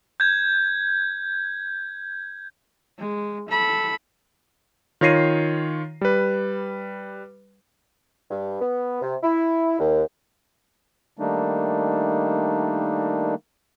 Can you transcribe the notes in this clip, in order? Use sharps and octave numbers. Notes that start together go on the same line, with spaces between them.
G6 G#6
G#3
A4 B5
D#3 F4 C#5 A#6 C7 D#7
G3 B4
G2
B3
C3
E4
D#2
D#3 G3 A3 A#3 D4 D#4